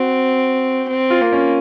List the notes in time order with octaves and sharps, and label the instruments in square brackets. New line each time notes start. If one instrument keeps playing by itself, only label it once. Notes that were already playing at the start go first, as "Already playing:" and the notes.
Already playing: [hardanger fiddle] C4 [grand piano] F#4
[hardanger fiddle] C4
[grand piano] F4
[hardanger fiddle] A#3
[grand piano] C#4